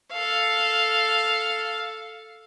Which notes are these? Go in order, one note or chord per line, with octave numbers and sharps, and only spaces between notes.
A4 F5